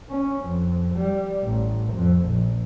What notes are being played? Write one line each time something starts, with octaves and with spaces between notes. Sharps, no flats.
C#4
F2
G3
A1
F2
A#1